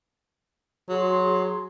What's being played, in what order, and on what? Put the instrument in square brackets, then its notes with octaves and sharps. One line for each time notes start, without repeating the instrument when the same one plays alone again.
[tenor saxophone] F#3 [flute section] F#4 G#4 C6